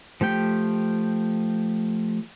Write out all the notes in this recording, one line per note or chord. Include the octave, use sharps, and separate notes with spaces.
F3 A3 G4 G5